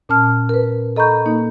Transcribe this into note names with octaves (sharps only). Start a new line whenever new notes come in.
A#2 C#4 A5 F6
A#4 B4
A4 D#5 A#5 B5 C#6 G6
A#3 D#4